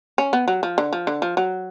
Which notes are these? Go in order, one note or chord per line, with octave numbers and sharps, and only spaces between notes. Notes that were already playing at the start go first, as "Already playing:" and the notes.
C#4
B3
F#3
F3
D3
F3
D3
F3
F#3